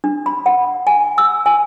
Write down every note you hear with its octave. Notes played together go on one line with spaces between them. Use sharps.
D4
B5
F#5
G#5
E6
G#5